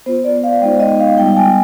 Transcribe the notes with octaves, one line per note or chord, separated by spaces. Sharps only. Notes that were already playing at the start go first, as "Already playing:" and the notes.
B3 F4 C5
D5
F5
G#3 B3 D#4 G5
D#5
F5
G3 B3 F4 G5
G#5